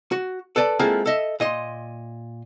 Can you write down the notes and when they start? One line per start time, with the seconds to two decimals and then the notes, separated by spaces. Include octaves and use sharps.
0.12 F#4
0.56 A4 B4 D5 G#5 A5
0.79 G#3 A#3 C4 E4 F4 A4
1.06 A4 D#5 E5
1.40 A#2 D#5 C6